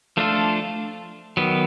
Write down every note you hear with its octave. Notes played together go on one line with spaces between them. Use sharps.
F3 A3 D4 F4 A4
D#3 F#3 B3